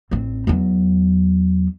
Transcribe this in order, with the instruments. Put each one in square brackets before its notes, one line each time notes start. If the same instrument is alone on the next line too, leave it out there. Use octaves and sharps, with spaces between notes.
[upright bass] A1 C4
E2 F#3